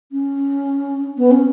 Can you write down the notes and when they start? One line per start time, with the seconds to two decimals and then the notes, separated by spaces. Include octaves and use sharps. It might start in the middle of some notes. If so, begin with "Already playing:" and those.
0.12 C#4
1.18 B3
1.31 C#4